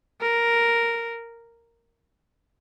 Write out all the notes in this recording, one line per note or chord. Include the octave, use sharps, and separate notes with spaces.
A#4